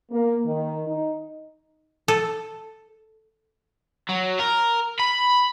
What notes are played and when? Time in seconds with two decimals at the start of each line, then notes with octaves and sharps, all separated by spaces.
0.12 A#3
0.45 D#3
0.87 D#4
2.08 A4
4.09 F#3
4.40 A#4
5.00 B5